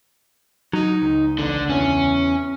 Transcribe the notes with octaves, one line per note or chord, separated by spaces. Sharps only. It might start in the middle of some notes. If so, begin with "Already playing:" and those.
F#3 D#4
C#2
A1 D3
E2 C#4